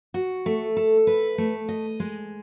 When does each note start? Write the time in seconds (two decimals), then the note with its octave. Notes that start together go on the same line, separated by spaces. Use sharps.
0.14 F#4
0.46 A3
0.77 A4
1.07 B4
1.38 A3
1.69 D#5
2.00 G#3